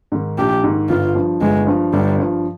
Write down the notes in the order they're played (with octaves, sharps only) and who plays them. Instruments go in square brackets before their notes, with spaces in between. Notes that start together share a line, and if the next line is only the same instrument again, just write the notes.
[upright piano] G#2 D#3
[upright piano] A#1 [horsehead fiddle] G4
[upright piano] G#2 D#3
[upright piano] G1 [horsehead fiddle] F4
[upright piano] G2 F3
[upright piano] G1 [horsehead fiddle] G#3
[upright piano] G2 F3
[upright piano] G1 [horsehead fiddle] G3
[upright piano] G2 F3